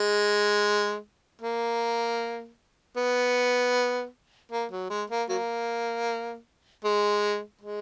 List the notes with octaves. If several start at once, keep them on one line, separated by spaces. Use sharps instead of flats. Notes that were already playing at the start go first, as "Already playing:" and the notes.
Already playing: G#3
A#3
B3
A#3
F#3
G#3
A#3
F#3 A#3
G#3
G#3